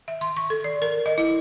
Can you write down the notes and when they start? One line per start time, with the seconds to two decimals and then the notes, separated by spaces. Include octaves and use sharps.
0.08 E5
0.21 C6
0.37 C#6
0.50 A4
0.64 D5
0.82 A#4
1.06 D#5
1.18 E4